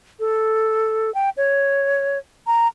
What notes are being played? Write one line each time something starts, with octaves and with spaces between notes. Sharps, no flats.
A4
G5
C#5
A#5